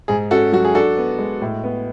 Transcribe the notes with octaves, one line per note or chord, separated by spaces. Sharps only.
G#2 G#4
C#4 F#4 A4
F#3 F#4
G#4
D4 F#4 A4
B3
G#3
A2
B3